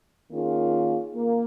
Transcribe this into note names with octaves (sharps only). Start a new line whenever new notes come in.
D#3 A#3 C#4 F4 G#4
A#3